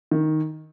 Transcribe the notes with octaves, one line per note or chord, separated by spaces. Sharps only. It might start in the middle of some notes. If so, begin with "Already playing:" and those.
D#3